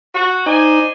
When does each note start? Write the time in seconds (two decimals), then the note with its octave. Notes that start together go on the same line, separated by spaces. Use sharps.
0.14 F#4
0.46 D#4 C5 D5 G#5